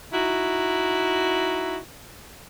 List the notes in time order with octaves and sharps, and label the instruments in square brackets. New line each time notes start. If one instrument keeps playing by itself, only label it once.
[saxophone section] D#4 E4 F#4